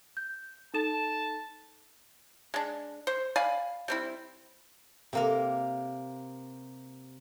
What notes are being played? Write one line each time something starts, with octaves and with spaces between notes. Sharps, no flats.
G6
D#4 A4 A5 E7
G#3 D4
C5
D5 F5 G#5 B5
G3 C4 E4
C3 A#3 A#4